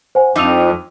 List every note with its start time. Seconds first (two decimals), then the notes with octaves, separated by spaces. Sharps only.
0.15 C5 F#5 G#5
0.36 F2 F3 D#4 D6 E6 F7